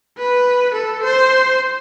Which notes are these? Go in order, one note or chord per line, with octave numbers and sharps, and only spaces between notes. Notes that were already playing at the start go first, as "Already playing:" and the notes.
B4
A4
C5